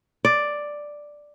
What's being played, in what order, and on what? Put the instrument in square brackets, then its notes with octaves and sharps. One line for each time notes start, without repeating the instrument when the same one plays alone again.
[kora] D5